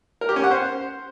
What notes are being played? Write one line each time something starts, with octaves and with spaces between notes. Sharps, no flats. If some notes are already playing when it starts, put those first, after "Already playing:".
A#4
G4
C#4
F#5
C5